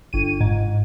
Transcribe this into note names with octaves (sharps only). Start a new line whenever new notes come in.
G1 D#7
G#2